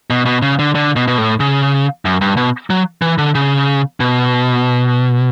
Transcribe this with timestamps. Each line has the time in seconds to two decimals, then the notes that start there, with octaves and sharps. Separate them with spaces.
0.10 B2
0.26 B2
0.42 C#3
0.59 D3
0.75 D3
0.96 B2
1.08 B2
1.18 A2
1.40 C#3
2.05 F#2
2.21 G2
2.37 B2
2.70 F#3
3.02 E3
3.18 D3
3.35 C#3
4.00 B2